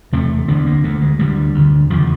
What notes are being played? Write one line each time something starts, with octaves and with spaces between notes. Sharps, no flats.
E2 C3 A3
D2 D3 B3
A#3
D2 D3 A3
G#3
D2 D3 G3
D2 D3
E2 C#3 F3